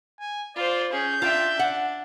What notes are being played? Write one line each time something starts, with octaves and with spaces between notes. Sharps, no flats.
G#5
F4 C5 D5
C#4 G#4 G6
D4 F4 E5 G5
D4 F#5